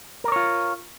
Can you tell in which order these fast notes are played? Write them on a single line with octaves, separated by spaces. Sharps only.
A#4 D5 C#5 F4